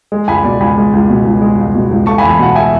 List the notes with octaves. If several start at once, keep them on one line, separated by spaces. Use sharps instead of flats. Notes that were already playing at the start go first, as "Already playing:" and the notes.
G#3
C#2 G#5 B5
B2 D5
C#2 G#5 B5
G#3
C#2
B2
C#2
G#3
C#2
B2
C#2
A3 A5 C#6
G#5 B5
E2
G#5 B5
B2 F#5 A5
E5 G#5